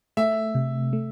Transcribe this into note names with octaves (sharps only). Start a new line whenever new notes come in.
A3 E5
C3
A3